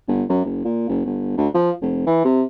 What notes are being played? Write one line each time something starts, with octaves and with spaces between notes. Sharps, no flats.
G1
F#2
F#1
A#2
F#1
G1
D2
F3
F1
E3
C3